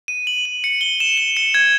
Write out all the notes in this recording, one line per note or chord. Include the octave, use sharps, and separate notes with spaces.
D#7
F#7
F#7
C#7
G7
E7
G7
C#7
G#6